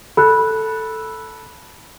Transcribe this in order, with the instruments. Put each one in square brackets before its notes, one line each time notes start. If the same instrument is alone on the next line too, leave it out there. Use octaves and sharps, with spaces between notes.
[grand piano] A4 [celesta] B5 F#6